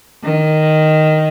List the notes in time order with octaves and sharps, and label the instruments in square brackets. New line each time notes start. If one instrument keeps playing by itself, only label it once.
[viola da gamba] D#3